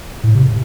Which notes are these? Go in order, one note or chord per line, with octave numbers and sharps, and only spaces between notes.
A2
C3